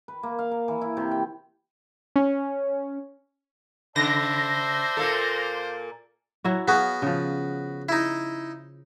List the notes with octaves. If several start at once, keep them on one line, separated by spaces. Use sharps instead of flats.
B4
A#3
F5
A#4
E3
E4
C3
G5
C#4
C#3 C5 D5 E5 A5 A#6
A#2 A#3 A4
F#3 E4 F#4
B3 F#4 G#4 F5
C#3 F3
D#4 E4